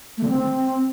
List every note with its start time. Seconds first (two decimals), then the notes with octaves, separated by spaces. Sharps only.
0.18 A3
0.23 D3
0.29 C4